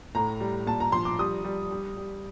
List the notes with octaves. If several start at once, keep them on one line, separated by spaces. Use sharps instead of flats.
A2 A#5
G3
A#2 A5
A#5
F3 C6
D6
G3 D#6
G3
G3
G3